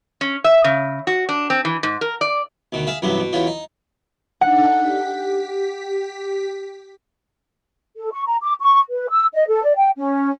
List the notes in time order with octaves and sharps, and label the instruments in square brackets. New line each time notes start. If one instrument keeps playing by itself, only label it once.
[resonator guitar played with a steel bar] C#4
E5
C#3
F#4
D4
C4
E3
G#2
A#4
D5
[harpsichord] D2 B2 D#3
G#4 E5 F5
A1 G2 C3 F#3 B3 C#6
B2
E2 B2 C#4 F4 C#6
D#4
[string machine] D4 D#4 A4 [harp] F#5
[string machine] G4 B6
[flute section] A4
C#6
A#5
D6
C#6
B4
E6
D#5
A4
D5
G5
C#4